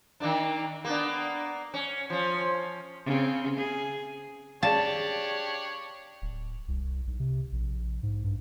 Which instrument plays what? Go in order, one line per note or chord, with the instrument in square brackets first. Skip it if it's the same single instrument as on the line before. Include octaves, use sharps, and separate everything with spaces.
[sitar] D#3 A#3 D4
A#3 B3 D4
C#4
F3 C#4
[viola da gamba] C#3 C4
G#4
[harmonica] D4 G4 C#5 [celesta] G#4 D5 F5 [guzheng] A5
[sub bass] D1
C2
B1
C3
A#1
G#2
G2